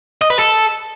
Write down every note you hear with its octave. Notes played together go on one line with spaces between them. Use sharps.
D#5
B4
A4